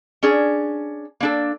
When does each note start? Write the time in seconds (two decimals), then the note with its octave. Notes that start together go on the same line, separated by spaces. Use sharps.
0.23 C#4 D4 G#4
1.20 A#3 D4 A4